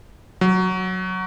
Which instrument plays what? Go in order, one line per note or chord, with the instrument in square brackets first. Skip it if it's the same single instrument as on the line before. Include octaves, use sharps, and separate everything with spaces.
[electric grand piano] F#3